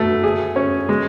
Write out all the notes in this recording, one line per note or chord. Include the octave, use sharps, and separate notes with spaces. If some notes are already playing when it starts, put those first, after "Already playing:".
Already playing: B2 A3
G#4
C#4
G#3